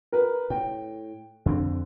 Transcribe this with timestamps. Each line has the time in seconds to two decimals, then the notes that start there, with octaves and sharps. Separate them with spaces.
0.12 A#4 B4
0.50 A2 G5
1.46 F2 D3 C4